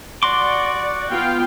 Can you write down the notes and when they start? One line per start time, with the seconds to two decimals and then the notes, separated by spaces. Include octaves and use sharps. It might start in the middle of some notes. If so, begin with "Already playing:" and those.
0.23 F#4 D5 C6 D6
1.11 B3 F4 G5